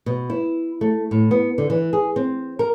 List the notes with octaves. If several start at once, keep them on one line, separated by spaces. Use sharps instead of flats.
B2
E4
A3
A2
B3
D3
E3
G#4
C4
A#4